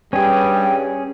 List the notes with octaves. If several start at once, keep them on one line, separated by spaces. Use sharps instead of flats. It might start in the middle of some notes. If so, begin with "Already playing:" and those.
G2 G3 C#4 G#4 G5